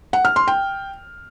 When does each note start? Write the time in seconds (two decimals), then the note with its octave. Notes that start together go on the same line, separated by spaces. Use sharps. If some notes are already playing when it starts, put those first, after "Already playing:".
0.13 F#5
0.25 F6
0.36 C6
0.48 G5